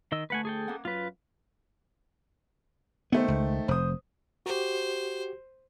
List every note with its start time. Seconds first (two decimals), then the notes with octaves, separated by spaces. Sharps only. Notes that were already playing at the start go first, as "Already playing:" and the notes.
0.12 D#3 D#5 E6
0.30 D2 A3 B4 F#5 G#5
0.45 G#4 A4 G5
0.68 A#3 F#5
0.85 F#2 F4 B4
3.12 D#3 A3 B3 C5
3.28 C#2
3.68 F1 C5 D#6
4.46 F#4 G4 C5